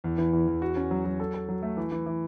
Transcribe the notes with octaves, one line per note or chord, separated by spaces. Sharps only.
E2
E3
E2
E2
F#4
C#4
F#3
F#3
A4
A4
F#3
A3
E3
E3
E3